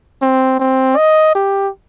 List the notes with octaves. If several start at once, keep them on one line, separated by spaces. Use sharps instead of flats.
C4
C4
D#5
G4